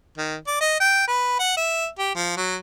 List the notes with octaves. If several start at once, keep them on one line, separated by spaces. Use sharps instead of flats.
D#3
D5
D#5
G5
B4
F#5
E5
G4
F3
F#3